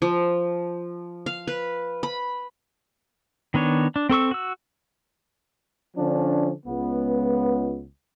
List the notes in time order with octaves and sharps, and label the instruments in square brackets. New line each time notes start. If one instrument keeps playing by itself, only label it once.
[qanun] F3
F5
B4
B5
[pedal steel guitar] D#3 B3 D4 C#5
D4
C4 A4 C#6 E6
F#4 E6
[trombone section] D3 F3 C#4 D4
C#2 B3